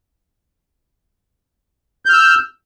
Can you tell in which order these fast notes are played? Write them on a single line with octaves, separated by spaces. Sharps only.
G6 F6 E6